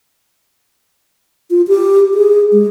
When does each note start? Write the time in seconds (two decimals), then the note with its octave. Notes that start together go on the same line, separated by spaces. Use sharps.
1.50 F4
1.68 G4
2.14 G#4
2.52 G#3